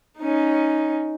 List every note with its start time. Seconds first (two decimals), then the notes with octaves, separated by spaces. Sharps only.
0.19 C#4 D#4